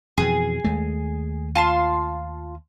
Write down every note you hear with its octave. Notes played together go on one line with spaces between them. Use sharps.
F2 B2 E3 G#4
D#2 G#3 A3
F4 A5 C6